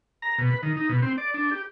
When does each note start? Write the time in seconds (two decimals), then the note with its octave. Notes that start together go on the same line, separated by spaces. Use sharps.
0.22 A#5
0.38 B2
0.50 B4
0.63 D#3
0.77 D#4
0.89 B2
1.02 C4
1.18 D5
1.34 D4
1.51 G4